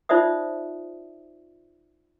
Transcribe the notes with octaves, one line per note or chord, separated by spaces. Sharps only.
D#4 F4 C5 D5 E5 D#6